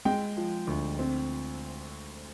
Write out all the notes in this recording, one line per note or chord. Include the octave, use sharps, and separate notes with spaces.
G#3 G5
F3
D2
C4